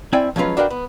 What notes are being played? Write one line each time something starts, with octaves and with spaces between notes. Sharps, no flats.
C4 E4 D5 G5 G#5
F3 F#3 G#3 C#4 F4 B4
D4 F#4 A#4 B4 F5 G5
B3